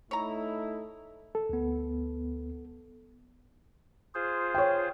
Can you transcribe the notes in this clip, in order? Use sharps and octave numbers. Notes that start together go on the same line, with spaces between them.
A3 D#4 E4 C#5 A#5
A4
D2 B3
F4 G#4 C5
C#5 G5